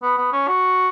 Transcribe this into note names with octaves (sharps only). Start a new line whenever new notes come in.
B3
B3
C#4
F#4